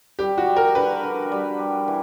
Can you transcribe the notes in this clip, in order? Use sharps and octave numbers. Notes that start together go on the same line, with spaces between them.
G3 G4
F#4
G3
A#4
D3 B4
D3
G3
G3
E3